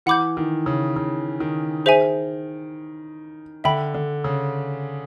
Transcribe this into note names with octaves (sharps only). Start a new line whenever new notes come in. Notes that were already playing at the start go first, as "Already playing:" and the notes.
E3 F#5 B5 D6 G6
D#3
C#3
C#3
D#3
G#4 C5 E5 G#5
D3 E5 G5 B5
D3
C#3